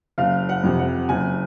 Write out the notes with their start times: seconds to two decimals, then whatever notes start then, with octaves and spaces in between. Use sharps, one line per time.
0.18 F#1 F5
0.49 F#5
0.63 F2 C3
0.79 F#5
1.09 F#1 G#5